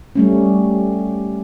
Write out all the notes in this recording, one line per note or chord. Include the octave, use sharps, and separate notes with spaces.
G3 A3 C#4